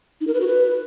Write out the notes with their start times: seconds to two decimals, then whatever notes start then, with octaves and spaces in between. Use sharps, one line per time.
0.21 D#4
0.27 A#4
0.34 B4
0.41 F#4
0.47 B4